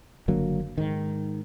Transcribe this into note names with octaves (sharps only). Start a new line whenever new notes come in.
F#1 D3 F#3 A#3
G#2 D#3